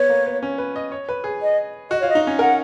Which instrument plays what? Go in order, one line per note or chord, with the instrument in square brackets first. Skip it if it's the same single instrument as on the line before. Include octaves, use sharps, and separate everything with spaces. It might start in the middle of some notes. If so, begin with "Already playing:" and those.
Already playing: [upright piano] B3 [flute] C#5
[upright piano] A#3
B3
C#4
B4
D#5
C#5
B4
G#4
[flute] D#5
[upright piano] F#4 [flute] D#5
[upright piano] F4 [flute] C#5
[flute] D#5
[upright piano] D#4
C#4
[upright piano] A#4 [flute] F#5